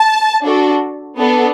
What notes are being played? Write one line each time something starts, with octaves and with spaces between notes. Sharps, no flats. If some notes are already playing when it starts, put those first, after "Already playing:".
Already playing: A5
D4 F#4 A4
B3 D4 A4